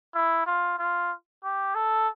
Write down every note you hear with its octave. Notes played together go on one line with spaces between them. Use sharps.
E4
F4
F4
G4
A4